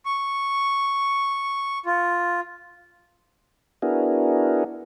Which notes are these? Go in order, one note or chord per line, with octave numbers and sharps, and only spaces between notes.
C#6
F4
B3 D4 E4 F#4 G#4 A#4